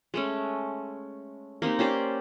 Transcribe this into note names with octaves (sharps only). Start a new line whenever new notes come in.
G#3 A3 C#4
A#3 C4 D#4 G4
C#4 G4 C5 D5